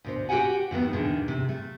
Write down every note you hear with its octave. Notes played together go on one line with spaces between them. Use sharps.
D2 B2 C5
F#4 G4 A#4 C#5 F#5 G#5
F2 D#3 A3 B3
E2 B2 D3 D#3
C3
A3